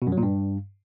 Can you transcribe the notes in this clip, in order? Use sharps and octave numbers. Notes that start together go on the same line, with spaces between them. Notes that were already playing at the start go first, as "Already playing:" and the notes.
B2
F#2
F#3
A#2
G2